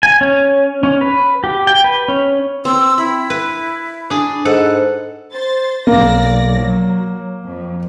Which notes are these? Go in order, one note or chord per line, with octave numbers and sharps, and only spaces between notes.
G#5
C#4
C#4
B4
G4
G5
B4
C#4
C4 E6
E4 B5
B4
D4 G#4
G#2 A4 B4 F#5
C5 A6
B1 A#3 D5 A#6
F#3
F2